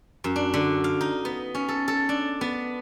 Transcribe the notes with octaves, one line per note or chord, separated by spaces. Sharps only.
F#2
D4
D3
F5
D#4
B3
C#4
A4
A4
D4
B3